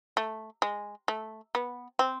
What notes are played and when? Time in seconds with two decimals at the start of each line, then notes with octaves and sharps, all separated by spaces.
0.17 A3
0.62 G#3
1.08 A3
1.55 B3
1.99 C4